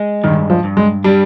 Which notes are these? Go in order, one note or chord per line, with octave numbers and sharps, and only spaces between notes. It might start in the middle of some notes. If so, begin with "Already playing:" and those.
Already playing: G#3
G2 D#3
F3
G2
G#3
G3 D4